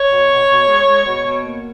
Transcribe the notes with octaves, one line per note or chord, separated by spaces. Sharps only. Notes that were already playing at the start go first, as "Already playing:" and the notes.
Already playing: C#5
B2
B2
B2
G#3
G#3
B2
B2
A#3